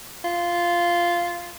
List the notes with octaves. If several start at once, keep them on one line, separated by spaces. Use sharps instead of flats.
F4